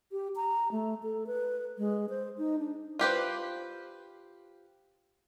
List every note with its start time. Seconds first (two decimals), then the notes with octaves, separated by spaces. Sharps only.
0.12 G4
0.36 A#5
0.72 A3
1.03 A4
1.27 B4
1.78 G#3
2.09 C5
2.38 D#4
2.59 D4
2.99 F4 G4 B4 C5